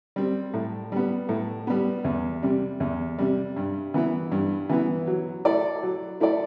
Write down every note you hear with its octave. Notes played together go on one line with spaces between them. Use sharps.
G3 C4
A2
G3 B3
A2
G3 B3
E2
C3 G3
E2
C3 G3
G2
E3 B3 E4
G2
E3 B3 E4
F#3
A3 E4 A4 D5
F#3
A3 E4 A4 D5